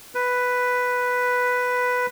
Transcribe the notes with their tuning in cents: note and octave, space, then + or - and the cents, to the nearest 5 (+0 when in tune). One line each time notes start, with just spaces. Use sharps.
B4 +5